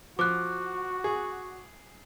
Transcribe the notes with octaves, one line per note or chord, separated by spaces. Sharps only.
F3 F#4 D6 F#6
G#4